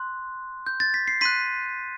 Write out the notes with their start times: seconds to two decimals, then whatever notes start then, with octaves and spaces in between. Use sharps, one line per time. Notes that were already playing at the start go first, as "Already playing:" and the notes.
Already playing: C6 F#6
0.67 G6
0.80 A6
0.94 B6
1.08 C7
1.21 C6 F#6 B6 D#7